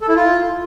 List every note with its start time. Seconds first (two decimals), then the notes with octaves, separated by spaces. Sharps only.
0.01 A4
0.09 E4
0.16 F4